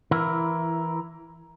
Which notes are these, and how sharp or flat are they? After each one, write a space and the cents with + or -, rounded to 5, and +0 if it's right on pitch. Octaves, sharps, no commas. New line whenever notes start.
E3 +0 E4 +20 A#4 +15